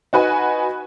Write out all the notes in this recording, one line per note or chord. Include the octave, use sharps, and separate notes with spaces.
D#4 F#4 B4 G#5